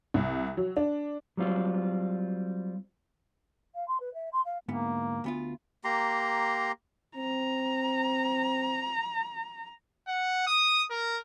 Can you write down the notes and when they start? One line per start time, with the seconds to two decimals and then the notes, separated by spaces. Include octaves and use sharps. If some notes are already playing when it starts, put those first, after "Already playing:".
0.14 C2
0.57 F#3
0.77 D4
1.37 F#3 G3 C4 F4
3.75 F5
3.88 C6
4.00 B4
4.14 E5
4.32 C6
4.45 F5
4.68 D2 G#2 A#3 B3
5.24 D2 B3 F4
5.84 A#3 G4 A#5 C6
7.16 C4 A#5
10.08 F#5
10.47 D#6
10.90 A#4